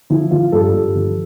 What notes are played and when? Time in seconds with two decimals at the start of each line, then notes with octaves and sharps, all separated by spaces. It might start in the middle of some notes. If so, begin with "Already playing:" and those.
0.10 F3 E4
0.31 F3 F4
0.52 G2 A4
0.74 G2
0.95 F3